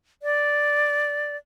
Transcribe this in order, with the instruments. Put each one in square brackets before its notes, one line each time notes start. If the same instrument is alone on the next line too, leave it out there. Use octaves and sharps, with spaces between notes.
[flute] D5